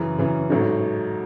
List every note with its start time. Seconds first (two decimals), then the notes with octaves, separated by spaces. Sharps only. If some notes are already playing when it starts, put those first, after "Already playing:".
Already playing: F#2 C#3 E3
0.18 F#2 C#3 E3
0.50 A1 G#2 F#3 A3 D#4